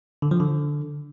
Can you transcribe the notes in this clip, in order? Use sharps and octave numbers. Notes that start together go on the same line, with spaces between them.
D3
F3
D3